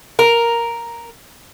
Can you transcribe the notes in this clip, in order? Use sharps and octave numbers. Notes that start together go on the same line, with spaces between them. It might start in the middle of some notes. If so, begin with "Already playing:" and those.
A#4